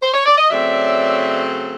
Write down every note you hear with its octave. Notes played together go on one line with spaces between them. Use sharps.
C5
C#5
D5
D#5
C#3 F#3 A3 C4 D5 E5